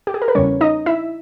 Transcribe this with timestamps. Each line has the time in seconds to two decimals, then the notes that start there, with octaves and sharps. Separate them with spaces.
0.07 G4
0.14 G#4
0.22 A#4
0.28 B4
0.35 E2 C#3 G3 C#4 C#5
0.61 D#4 D#5
0.86 E4 E5